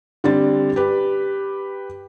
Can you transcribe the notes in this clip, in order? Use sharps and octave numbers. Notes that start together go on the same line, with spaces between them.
D3 G3 C4 D4 A6
G4 B4